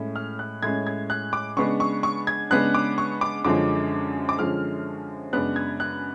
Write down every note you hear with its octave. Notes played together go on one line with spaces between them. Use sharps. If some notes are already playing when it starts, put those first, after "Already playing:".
Already playing: A2 G#3 C#4
F6
F#6
A2 G#3 C#4 G#6
G#6
F#6
D6
C#3 G#3 B3 D4 C#6
C#6
C#6
G#6
C#3 G#3 B3 D4 F#6
D6
C#6
D6
F#2 D3 F3 G#3 C#4 D6
D6
F#2 D3 F3 G#3 C#4 F6
F#2 C#3 G#3 B3 D4 F#6
G#6
F#6